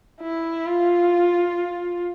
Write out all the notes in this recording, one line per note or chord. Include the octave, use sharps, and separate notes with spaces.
E4
F4